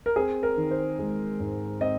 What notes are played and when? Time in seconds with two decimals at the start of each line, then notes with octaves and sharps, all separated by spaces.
0.06 A#4
0.16 C4 G#4
0.43 A#4
0.57 D#3
0.71 C5
0.99 G#3
1.40 G#2
1.81 C4 D#5